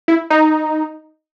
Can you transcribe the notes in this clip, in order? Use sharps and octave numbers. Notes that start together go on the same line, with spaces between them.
E4
D#4